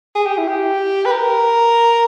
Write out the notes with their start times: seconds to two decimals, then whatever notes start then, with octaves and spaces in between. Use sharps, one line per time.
0.15 G#4
0.26 G4
0.37 E4
0.48 G4
1.05 B4
1.12 A#4